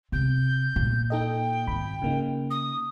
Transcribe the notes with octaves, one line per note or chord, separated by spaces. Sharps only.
C3 G6
A#2
D#4 A4 D#5 G5
G#1 B5
C#3 A#3 D#4 F4
D#6